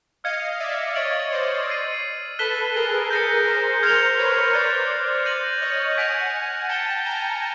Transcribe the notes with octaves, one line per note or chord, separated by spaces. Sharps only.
D#5 F5 F6 G#6 C#7
D5 E5
C#5 D#5 A6 D7 F#7
C5 D5
E6 A6 C7 D#7
A4 B4 F#6 B6 E7 G7
G#4 A#4
G#4 A#4 G6 A#6 C#7
A#4 C5
A#4 C5 F6 G#6 C#7 F7
B4 C#5
C5 D5 F#6 A6 C#7
G6 A#6 D#7 F#7
C#5 D#5
F#5 G#5 G#6 B6 D7 F7
G5 A5 A6 C#7 E7 G7
G#5 A#5